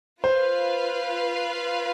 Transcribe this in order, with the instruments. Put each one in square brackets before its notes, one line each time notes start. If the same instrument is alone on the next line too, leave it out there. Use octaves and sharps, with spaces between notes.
[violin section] F4 B4 F5 [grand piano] C5